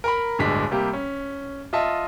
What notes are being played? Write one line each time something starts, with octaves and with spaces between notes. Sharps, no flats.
A#4 A#5 B5
D1 G1 G#3 D4 B6
C3 G3 A#3 G4
C#4
F4 D#5 E5 A5